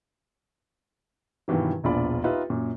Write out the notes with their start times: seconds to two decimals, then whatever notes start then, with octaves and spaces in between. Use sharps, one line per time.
1.48 G2 B2 D#3 E3 F#3
1.84 E1 A#1 E2 F4 D5 B5
2.24 D#4 F4 G4 B4 E5
2.50 F#2 A#2